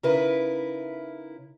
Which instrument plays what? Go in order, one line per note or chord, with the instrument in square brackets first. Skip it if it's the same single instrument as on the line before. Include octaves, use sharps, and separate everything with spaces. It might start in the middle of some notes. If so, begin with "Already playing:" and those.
[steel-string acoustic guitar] C#3 D#4 E4 A#4 B4